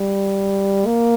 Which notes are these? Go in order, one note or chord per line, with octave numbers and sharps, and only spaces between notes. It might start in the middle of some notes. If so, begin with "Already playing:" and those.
Already playing: G3
A#3